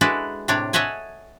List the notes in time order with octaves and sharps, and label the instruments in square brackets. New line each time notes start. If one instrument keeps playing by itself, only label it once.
[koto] G#3 D4 E4 F#4 A4 B4
A2 C3 D4 C#5 D5
A4 C#5 D#5 E5 F#5 G#5